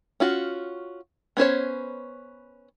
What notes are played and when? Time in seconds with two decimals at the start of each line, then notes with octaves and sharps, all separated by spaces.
0.20 C#4 F4 F#4
1.37 B3 C#4 C5 C#5